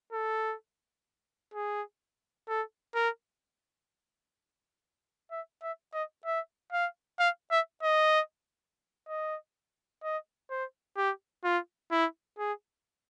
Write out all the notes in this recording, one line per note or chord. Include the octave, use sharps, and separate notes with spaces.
A4
G#4
A4
A#4
E5
E5
D#5
E5
F5
F5
E5
D#5
D#5
D#5
C5
G4
F4
E4
G#4